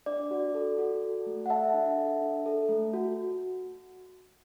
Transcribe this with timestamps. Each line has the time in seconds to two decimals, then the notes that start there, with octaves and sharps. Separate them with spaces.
0.06 D4 D5
0.31 F#4
0.55 A4
0.78 F#4
1.02 A4
1.26 A3
1.46 F#5
1.50 A4 E5 A5
1.74 D4
1.97 A4
2.21 D4
2.46 A4
2.69 A3
2.94 F#4